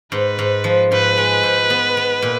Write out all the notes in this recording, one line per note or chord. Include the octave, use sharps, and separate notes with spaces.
G#2 B4
G#2
F3
G#2 B4
G#3
G#2
B3
B3
A#2